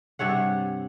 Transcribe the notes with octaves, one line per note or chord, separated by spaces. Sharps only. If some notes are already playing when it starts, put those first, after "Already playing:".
G2 C3 C#5 F#5